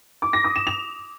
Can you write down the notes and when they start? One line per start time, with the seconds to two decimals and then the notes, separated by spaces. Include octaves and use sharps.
0.22 D6
0.33 A#6
0.44 D#6
0.56 E7
0.67 F7